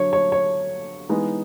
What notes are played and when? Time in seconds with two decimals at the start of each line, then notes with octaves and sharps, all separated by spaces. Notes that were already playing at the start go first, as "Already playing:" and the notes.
Already playing: D3 F#3 D4 C#5
0.13 C#5
0.32 C#5
1.09 E3 G#3 B3 D#4